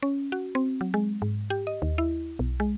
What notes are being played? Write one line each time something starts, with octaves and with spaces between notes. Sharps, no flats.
C#4
F#4
C4
F#3
G#3
G#2
G4
D#5
D#2
E4
B1
G#3